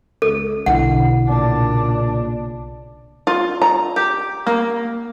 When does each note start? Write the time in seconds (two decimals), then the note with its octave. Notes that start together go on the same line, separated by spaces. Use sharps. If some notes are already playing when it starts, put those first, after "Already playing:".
0.22 C#2 A4
0.66 B1 D3 E4 F#5
1.24 A#2 C#3 D4
3.27 F4
3.62 A#5
3.96 G4
4.47 A#3